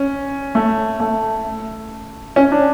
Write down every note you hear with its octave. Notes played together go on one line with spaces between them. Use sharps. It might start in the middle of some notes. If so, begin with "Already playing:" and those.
Already playing: C#4
A3
A3
C#4
D4